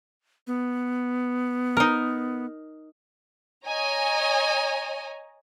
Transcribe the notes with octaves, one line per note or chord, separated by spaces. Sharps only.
B3
D#4 A#4
C#5 D#5 G#5 A#5